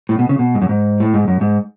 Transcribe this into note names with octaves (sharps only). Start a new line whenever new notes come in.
A2
B2
C#3
B2
G#2
F#2
G#2
A2
G#2
F#2
G#2